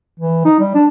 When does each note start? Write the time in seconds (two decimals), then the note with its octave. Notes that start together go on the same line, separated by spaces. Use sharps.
0.20 E3
0.45 D#4
0.59 G3
0.75 D4